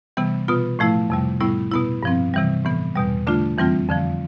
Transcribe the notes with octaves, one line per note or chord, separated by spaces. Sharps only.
C3 E3 G3 B3
B2 B3 F4
A2 F3 A3 E4
F2 C3 G3
A2 G3 B3 E4
B2 B3 E4
G2 F3 C4
C3 E3 G3
A2 E3 B3
E2 B2 G3
D3 A3 D4 F4
F2 E3 G3 C4 F4
F2 D3 F3